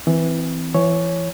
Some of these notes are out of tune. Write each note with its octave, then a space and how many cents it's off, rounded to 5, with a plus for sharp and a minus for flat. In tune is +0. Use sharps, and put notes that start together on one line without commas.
E3 +0 C4 -20
E3 +35 C#5 +0